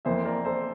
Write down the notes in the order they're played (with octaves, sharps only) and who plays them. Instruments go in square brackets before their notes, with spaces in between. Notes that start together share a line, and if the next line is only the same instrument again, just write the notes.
[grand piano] F2 E3 A#3 C5 E5
A#4 D5
A4 C5